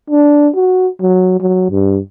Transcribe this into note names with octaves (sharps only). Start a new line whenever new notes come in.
D4
F#4
F#3
F#3
G2